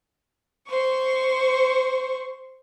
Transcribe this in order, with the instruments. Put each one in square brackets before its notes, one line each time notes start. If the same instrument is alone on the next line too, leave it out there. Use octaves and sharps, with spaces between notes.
[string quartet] C5 C#6